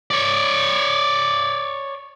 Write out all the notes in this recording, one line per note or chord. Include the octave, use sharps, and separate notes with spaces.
C#5 D5